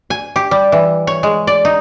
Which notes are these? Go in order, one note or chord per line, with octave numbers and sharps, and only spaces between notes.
G#5
G4
G3
E3
C#5
G#3
D5
D#4